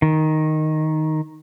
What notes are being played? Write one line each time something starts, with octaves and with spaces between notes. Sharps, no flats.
D#3